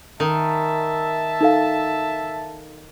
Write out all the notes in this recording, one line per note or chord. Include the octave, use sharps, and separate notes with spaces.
D#3 E5 A5
D#4 A4 F5